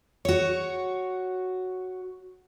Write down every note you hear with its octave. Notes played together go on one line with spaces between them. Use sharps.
F#4 C#5